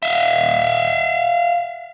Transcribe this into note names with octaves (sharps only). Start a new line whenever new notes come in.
E5 F5